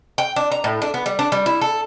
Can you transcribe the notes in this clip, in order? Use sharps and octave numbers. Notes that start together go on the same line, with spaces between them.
G5
D4
A#5
A2
D4
B3
G3
D4
G3
E4
A4